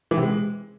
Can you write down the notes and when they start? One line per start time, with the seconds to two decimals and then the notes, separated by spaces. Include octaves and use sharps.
0.11 E3
0.17 C3
0.23 G#3